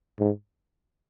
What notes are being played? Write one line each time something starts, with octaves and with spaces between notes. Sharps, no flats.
G#2